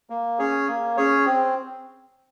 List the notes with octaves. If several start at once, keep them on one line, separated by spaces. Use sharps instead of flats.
A#3
C#4 G#4 C#5
A#3
C#4 G#4 C#5
C4